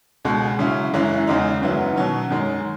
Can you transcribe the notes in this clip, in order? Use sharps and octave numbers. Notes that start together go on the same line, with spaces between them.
C#2 B2 G#3
C#3 F#3 C#4 E4
F#2 E3 G#3 C#4 E4
E2 C#3 G#3 D#4
F#2 D#3 F#3 B3 E4
B2 F#3 C#4
F#2 D#3 G#3